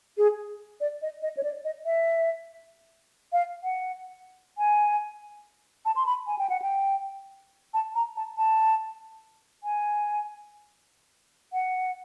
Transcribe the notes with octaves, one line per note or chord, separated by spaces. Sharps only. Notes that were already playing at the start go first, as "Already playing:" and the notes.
G#4
D5
D#5
D#5
C#5
D5
D#5
E5
F5
F#5
G#5
A5
C6
B5
G#5
G5
F#5
G5
A5
A#5
A5
A5
G#5
F#5